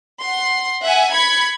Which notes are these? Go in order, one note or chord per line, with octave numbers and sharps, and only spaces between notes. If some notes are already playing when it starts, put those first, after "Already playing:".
F#5 C6
E5 F#5 G#5
B5 G#6 C#7